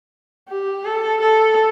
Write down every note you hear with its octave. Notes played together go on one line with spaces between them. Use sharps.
G4
A4
A4